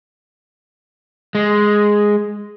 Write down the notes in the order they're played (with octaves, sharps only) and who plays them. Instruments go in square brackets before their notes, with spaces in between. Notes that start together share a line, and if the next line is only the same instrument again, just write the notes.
[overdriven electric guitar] G#3